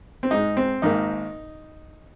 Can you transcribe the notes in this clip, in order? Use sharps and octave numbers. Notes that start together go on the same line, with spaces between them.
C4
G#2 G#3 D#4
C4
G#1 G#2 D#3 A#3 D#4